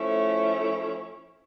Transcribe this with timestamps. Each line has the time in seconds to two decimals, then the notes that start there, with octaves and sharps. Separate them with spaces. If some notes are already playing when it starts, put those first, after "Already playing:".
Already playing: F3 A3 C#4 E4